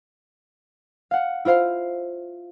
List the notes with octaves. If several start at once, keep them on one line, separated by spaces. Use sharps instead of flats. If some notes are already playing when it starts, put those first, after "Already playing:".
F5 F#5
E4 F4 C5 F5